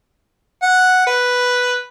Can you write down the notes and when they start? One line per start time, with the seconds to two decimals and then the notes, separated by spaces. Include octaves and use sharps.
0.62 F#5
1.07 B4